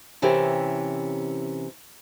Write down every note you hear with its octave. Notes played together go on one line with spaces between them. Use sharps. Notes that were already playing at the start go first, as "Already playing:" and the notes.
C3 E3 C#4 E4 G4 A#4